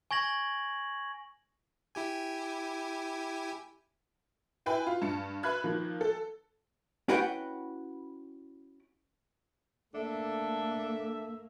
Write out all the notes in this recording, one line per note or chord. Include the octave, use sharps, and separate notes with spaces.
G#5 C#6 G#6 A#6 F#7
E4 G4 G#5
E4 B4 G5 G#5
F4
G2 A5 C#7
B4 E5 B5 F#6 G#6
D#3 F3 A#3
A4
C#4 E4 F#4 B4 F#5 G5
A3 A#3 D4 A4 E5